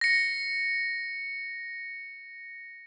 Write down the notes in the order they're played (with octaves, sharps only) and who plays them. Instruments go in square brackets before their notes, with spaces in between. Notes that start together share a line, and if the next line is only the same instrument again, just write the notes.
[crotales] A#6 C#7